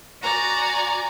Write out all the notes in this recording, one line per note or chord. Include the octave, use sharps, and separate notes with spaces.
F#4 D5 G#5 A#5